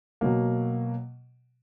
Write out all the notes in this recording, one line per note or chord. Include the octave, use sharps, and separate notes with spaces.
B2 F#3 A#3